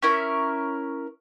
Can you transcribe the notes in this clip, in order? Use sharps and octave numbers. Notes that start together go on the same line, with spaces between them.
C#4 E4 A#4